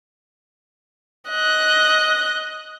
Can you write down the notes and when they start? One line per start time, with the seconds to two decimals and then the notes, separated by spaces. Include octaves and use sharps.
1.30 D#5 F#6